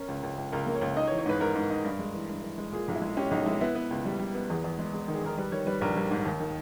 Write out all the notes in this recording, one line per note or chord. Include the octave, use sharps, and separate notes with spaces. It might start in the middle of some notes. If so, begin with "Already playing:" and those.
Already playing: C#4 A#4
C#2
C#2
C#2
C#2 A#4
A#3
C#5
C#2
D#4 D#5
C#5
E3
C#5
G#2 B4
G#2 A#4
G#2
D#4
G2
G#3
E3
G2
E3
G#3
A#2 G#4
B1
E4
G#3
C#4 G4
B1 D#4
G#3 E4
B3 E4
B3
C#2
G3
G3
B3
E2 G#4
E2
G#3
G#3
D#3
G#4
D#3 A#4
G3 B4
D#3 C#5
G3 B4
A#1 A#4
G3
G#2
D#2
D#3